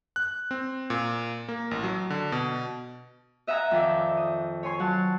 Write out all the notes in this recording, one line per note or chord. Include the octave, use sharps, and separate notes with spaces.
F#6
C4
A#2
A#3
A1
F#3
D3
B2
D#5 E5 F#5 G#5 A#5
F2 D#3 F4 D5 E5
D#6
C#5 G#5 C6
F#3 F#5 A5